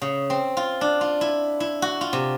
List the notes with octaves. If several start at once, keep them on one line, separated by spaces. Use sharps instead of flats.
C#3
C4
F4
D4
F4
E4
E4
F#4
F4
C3